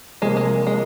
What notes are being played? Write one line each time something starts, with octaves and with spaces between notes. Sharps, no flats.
C3 F3 G#3 A#3
G#3
G#3